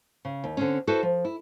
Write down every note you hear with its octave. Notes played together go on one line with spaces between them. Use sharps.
C#3
D#2
D3 C4 C#4
E4 F#4 A4 B4 C5
F3
E4